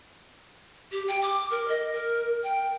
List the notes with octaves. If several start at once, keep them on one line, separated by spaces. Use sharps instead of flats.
G4
G5
D6
A#4
D#5
A#4
G5